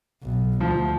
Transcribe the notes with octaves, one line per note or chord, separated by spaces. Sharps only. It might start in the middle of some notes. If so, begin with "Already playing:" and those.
B1
D2 F3